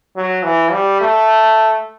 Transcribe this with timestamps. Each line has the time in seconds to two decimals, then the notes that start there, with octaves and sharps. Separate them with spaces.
0.16 F#3
0.43 E3
0.72 G3
1.01 A3